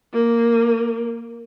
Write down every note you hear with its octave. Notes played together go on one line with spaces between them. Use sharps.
A#3